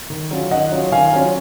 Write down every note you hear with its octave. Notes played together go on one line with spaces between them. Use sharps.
D#3
F#3 C#4 F4
D#3 D#5 F#5
F#3 C#4 F4
D#3 F5 G#5
F#3 C#4 F4